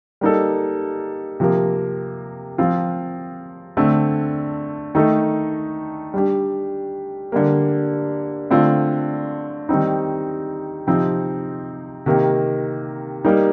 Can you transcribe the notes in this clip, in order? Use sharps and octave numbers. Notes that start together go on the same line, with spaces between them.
G3 A#3 D#4 A4
C3 F3 A#3
F3 C4 F4
D3 A3 C4
D#3 A3 D#4 A4
G3 D4 G4
D3 G3 A#3
D3 A3 C4 F4
D#3 G3 C4 D#4
C3 F3 C4 D#4
C3 D#3 A#3
G3 A#3 D#4